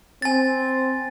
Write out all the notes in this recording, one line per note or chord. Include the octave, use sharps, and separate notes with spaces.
C4 G#5 A6